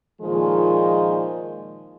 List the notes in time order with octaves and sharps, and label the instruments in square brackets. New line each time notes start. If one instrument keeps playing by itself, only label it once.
[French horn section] A#2 D#3 F3 G#3